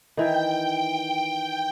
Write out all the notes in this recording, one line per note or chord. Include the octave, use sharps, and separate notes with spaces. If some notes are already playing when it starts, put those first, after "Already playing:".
D#3 E3 G5